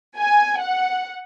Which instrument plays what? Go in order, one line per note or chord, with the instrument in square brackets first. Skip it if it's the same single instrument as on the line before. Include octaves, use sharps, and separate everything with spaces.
[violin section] G#5
F#5